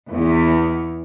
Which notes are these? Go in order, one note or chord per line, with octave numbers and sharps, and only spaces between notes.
E2